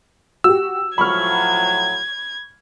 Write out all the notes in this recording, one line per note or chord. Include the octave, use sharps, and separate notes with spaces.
F#4 G4 E6
A2 F3 F#3 B5 C#6 F6 G#6